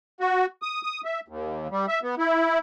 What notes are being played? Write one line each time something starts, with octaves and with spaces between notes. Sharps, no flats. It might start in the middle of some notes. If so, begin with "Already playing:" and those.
F#4
D#6
D#6
E5
D#2
G3
E5
B3
E4